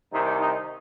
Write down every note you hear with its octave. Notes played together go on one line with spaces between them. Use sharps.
C2 C3 D#3 D#4
D#4